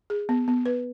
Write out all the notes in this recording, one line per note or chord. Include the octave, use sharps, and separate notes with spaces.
G#4
B3
B3
B4